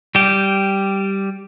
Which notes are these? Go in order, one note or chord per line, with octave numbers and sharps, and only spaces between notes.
G3 G4